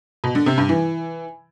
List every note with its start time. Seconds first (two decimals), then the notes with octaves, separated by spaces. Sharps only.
0.24 B2
0.35 D3
0.46 C3
0.58 G2
0.69 E3